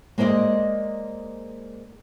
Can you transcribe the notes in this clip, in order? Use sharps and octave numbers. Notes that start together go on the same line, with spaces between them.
G#3 A#3 C5 D5 D#5